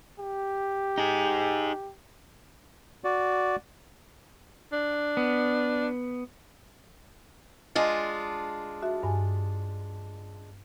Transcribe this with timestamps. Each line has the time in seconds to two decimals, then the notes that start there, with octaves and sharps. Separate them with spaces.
0.19 G4
0.98 D#4 G#4
3.04 F#4 D5
4.73 D4
5.17 B3
7.75 G#3 D4 F4
8.83 F#4 E5
9.03 G2 G#5